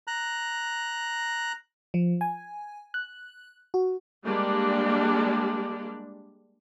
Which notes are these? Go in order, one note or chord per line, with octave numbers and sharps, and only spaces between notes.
A#5 F#6
F3
G#5
F#6
F#4
G3 G#3 A#3 D4 G4